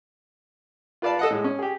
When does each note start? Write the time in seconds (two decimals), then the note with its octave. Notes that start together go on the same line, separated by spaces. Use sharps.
1.02 F4 B4 D5 F5 A5
1.19 A4 D#5 F#5
1.31 A2 G#3
1.44 C#4
1.59 G4 G#4